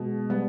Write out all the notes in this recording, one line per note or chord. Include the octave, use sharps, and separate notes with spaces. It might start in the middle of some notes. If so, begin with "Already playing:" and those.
Already playing: B2 G#3
G3 B3